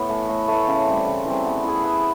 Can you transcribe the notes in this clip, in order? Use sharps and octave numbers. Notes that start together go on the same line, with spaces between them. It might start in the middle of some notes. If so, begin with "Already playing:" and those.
Already playing: A2 B3
E3 A3
A2
E3 A3
C#3
E3 G3 C4
C#3
E3 G3 C4
B3
E4 G#4
B3